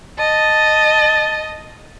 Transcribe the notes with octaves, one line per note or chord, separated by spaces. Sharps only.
D#5 A5